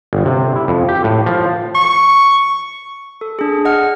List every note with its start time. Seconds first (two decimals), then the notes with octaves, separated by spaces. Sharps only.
0.13 G1
0.25 C3
0.56 E4
0.68 F2
0.89 G4
1.04 A2
1.26 F3
1.75 C#6
3.21 A4
3.39 D4 G#4
3.65 D#5 F#5 F6